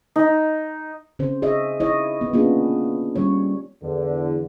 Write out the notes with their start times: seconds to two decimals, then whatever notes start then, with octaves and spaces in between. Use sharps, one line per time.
0.16 D#4
1.19 C#3 C4 C5
1.42 G#4 C#5 D#5 E5
1.80 E4 C#5 D#5
2.21 B3
2.33 A#3 B3 C#4 D4 F4 G#4
3.16 G3 C#4 C#5
3.83 E2 D3